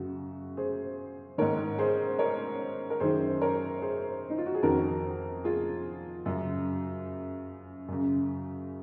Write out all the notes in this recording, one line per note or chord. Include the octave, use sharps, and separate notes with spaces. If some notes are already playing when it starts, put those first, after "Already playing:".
Already playing: F#2 C#3 F#4
G#4 C5
G#2 D#3 A#4 C#5
G#4 C5
A#4 C#5
A#4
F#2 D#3 G#4 C5
A#4 C#5
G#4 C5
D#4
F4
F#4
G#4
F2 D#3 F#4 A#4
F4 G#4
F#2 C#3
F#2 C#3